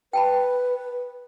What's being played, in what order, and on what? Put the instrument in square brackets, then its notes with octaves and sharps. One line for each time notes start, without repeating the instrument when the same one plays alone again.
[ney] B4 [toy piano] G5 A5 B5